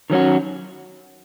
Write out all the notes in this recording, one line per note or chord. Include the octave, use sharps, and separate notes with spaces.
D#3 F#3 A#3 C#4 F#4